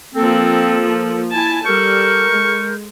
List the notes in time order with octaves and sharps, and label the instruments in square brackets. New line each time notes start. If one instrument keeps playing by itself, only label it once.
[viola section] F3 A#3 [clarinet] C4 [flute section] A4
[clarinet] E4 [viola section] G#5 A5
[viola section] G3 A4 [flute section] A#4 F6 G6 [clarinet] C#6
[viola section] G#3